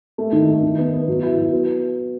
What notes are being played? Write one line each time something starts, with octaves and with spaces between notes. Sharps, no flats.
A3
D#3
A3
D#3
B3
B3
F#3
E4
F#3
B3